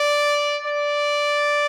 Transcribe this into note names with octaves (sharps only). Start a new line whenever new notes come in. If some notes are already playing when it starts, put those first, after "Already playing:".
Already playing: D5
D5